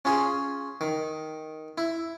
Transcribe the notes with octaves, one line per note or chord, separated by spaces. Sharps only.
C#4 F4 G#4
D#3
E4